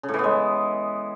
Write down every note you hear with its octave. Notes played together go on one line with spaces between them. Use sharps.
C#3
A2
E3
B3
G#3